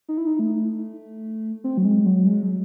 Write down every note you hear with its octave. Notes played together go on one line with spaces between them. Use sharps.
D#4
E4
D#4
A3
C4
F#3
G#3
F#3
G#3
F#3